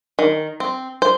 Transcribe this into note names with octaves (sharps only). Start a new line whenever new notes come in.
D#3
C4
C5